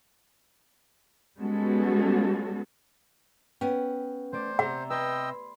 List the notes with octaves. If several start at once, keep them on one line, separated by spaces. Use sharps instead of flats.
G3 G#3 B3 C#4 F#4 A4
B3 C#4 G5
A3 C5 D5
C3 F#5 A#5 E6
B4 D#5 G5 C6 E6 G#6